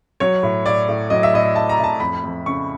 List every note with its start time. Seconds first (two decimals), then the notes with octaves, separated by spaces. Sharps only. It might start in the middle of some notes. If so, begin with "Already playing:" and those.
0.20 F#3 C#5
0.43 A2
0.66 A2 D5
0.88 A2
1.10 F#3 D#5
1.23 E5
1.34 A2 D#5
1.56 A2 A5
1.69 A#5
1.79 A2 A5
2.00 F2 B5
2.24 F2
2.46 C#3 C#6